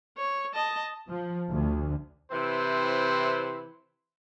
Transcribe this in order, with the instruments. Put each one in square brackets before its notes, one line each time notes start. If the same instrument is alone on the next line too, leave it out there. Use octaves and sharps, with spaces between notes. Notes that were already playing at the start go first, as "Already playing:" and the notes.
[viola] C#5
D#5 A5
[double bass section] F3
D2
[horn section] C3 E3 C4 E4 C5